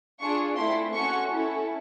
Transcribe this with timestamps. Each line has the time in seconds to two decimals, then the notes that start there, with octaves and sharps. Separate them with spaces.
0.20 D4 F4 G#4 C#6
0.57 A3 C4 E4 C6
0.93 C#4 F#4 A4 C#6
1.31 C#4 E4 A4